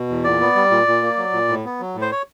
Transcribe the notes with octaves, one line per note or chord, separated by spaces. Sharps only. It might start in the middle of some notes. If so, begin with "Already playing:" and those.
Already playing: B2
E2
A#2 D5
B3
G3
A#2
A#2
A#3
F#3
A#2
A2
B3
F#3
A2
C5
C#5